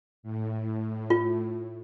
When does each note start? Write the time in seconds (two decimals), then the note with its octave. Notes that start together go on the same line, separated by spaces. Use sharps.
0.23 A2
1.10 F4